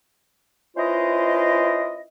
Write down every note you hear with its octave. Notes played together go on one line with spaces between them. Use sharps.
C#4 E4 F4 B4 C5 D#5